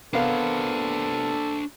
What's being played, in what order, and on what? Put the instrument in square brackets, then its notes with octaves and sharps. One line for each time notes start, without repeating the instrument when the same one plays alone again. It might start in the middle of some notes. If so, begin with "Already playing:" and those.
[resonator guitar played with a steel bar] C3 F5 [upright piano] B3 A#4 [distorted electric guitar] D4 C5 [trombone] A4